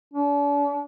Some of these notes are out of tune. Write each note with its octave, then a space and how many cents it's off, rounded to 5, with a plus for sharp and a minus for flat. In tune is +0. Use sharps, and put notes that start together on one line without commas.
D4 -45